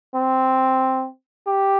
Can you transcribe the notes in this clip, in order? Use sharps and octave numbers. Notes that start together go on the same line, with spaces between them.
C4
G4